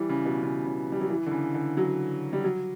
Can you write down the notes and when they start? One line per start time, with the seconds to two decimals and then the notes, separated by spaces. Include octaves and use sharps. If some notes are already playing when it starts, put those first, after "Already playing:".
Already playing: E3 G3
0.09 C#3
0.25 B2
0.43 C#3
0.65 C#3
0.92 G3
1.01 F#3
1.10 E3
1.26 D3
1.31 C#3
1.54 D3
1.77 F#3
2.33 G3
2.44 F#3